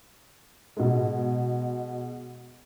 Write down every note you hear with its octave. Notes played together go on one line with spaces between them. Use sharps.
B2 G#3